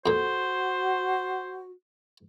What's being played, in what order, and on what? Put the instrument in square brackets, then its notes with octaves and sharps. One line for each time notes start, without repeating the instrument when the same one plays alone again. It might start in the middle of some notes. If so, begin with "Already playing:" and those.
[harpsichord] F2 A#2 [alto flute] F#4 [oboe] C5